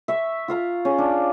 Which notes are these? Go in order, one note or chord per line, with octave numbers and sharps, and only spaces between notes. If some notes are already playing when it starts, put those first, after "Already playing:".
E5 C#6
F4 F5 A#5
C#4 G#4
D4